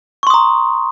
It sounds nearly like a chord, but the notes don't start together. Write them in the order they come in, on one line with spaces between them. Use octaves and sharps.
C#6 C6 D#6 A#5